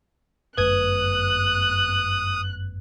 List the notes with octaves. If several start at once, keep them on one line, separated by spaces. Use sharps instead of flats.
G1 F#2 A3 B4 D#6 F#6 G#6